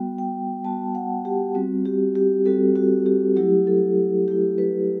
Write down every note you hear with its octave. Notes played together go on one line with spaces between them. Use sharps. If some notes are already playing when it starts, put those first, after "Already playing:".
Already playing: G3 B3 F#4 G5
G5
G3 B3 F#4 A5
F#5
G4
G3 C4 F#4
G4
G4
G3 C4 F#4 A4
F#4
G4
F#3 A3 E4 G4
A4
F#3 A3 E4 G4
B4